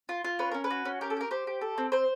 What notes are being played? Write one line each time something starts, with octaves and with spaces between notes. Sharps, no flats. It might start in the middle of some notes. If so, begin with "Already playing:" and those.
F4
F4
C#4 B4
C#4 A#4
B4
F#4
C#4
G4 A#4
A4
G4 A#4
G4 C5
G4
A4
C4
C4 C5